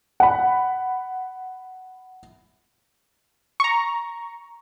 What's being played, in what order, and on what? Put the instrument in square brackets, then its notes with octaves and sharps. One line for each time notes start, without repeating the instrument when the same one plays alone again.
[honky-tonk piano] F#5 B5
[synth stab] A#5 C#6